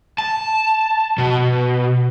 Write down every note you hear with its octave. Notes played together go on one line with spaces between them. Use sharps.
A5
B2